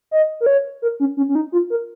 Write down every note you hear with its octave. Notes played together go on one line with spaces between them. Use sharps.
D#5
A#4
C#5
A#4
C#4
C#4
C#4
D#4
F4
A#4